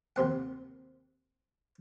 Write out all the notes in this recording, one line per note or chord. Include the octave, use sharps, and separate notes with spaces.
D#2 C3 C4 F#5